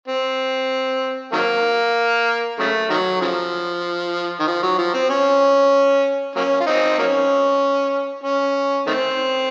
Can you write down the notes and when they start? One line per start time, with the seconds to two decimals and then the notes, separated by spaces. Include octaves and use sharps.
0.08 C4
1.33 D#3 F#3 A#3
2.59 C#3 F#3 A3
2.90 D#3 F#3
3.22 C#3 F3
4.40 D#3
4.47 F3
4.63 F#3
4.79 F3
4.94 C4
5.10 C#4
6.36 F#3 A#3 C#4
6.60 F4
6.67 C4 D#4
6.99 F#3 A#3 C#4
8.24 C#4
8.87 D#3 A3 C4